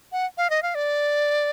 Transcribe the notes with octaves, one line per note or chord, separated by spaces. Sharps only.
F#5
F5
D#5
F5
D5